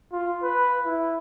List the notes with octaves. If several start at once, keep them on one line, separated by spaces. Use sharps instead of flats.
F4
B4
E4